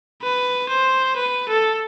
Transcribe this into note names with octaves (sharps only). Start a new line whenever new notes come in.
B4
C5
B4
A4